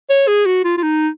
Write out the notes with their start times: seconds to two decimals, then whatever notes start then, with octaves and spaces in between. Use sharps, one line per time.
0.10 C#5
0.28 G#4
0.46 F#4
0.64 F4
0.78 F4
0.83 D#4